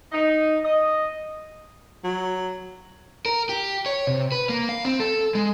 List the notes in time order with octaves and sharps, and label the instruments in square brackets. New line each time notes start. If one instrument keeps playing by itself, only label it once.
[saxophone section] D#4
D#5
[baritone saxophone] F#3
[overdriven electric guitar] A#4
G4
C#5
C3
B4
A#3
F5
C4
A4
G#3